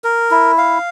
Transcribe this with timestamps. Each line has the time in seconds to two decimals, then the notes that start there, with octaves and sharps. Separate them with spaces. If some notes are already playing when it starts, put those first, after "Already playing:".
0.04 A#4
0.31 E4
0.58 F5